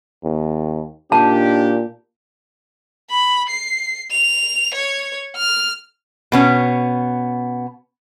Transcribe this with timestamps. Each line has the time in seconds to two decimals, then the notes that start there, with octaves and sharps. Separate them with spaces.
0.24 D#2
1.12 A#2 D4 D#4 G4 A5
3.10 B5
3.49 C7
4.11 F7
4.74 C#5
5.36 F6
6.32 B2 B3 C#4